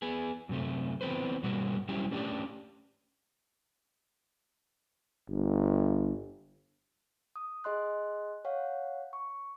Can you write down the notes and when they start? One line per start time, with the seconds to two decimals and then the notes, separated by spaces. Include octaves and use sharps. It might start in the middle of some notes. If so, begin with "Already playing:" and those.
0.02 B3 G#4
0.49 F#2 C3 A3
1.01 E3 B3 C4 B4 C5
1.43 G2 B2 G3 A#3 F#4
1.89 F#3 G3 C#4 E4 G4
2.11 A3 C#4 D4 F#4 G4 D5
5.29 G1
7.36 D#6
7.64 G#4 D#5 C6 F#6
8.45 C#5 F5 F#5
9.13 C#6